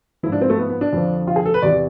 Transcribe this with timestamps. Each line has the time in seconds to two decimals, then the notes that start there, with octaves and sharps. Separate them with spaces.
0.23 G#2 F3 E4
0.32 D4
0.41 C4
0.50 A3
0.58 B3
0.70 B3
0.81 D4
0.93 F2 D3 F3
1.27 F4
1.36 G#4
1.46 A4
1.54 B4
1.62 E2 C3 E3 D5